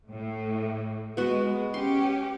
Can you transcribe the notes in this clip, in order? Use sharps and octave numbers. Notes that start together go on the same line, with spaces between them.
A2
G#3 B3 F#4
C#4 G4 C6